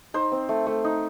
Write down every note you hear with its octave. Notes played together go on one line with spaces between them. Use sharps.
D#4 C5
C4
A3
A3
D#4